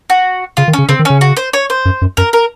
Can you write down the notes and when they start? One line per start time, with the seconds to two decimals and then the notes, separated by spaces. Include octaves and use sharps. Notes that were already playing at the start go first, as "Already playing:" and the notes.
0.10 F#4
0.57 C#3 F4
0.68 D#3
0.73 C#4
0.78 C#3
0.89 C#3 C4
0.99 D#3
1.05 C#3 C#4
1.21 F#4
1.37 C5
1.53 C#5
1.70 C5
1.85 F#2
2.02 F#2
2.17 F#2 A#4
2.33 A#4